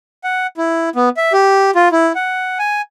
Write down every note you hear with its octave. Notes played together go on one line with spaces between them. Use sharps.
F#5
E4
B3
E5
G4
F4
E4
F#5
G#5